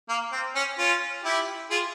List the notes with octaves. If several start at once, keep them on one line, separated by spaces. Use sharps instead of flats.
A#3
C4
C#4
C#4 F4
E4 G4
F4 G#4